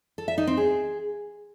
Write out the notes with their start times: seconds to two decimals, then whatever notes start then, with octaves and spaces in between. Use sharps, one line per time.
0.18 A4
0.28 E5
0.38 D#4
0.47 C4
0.57 G#4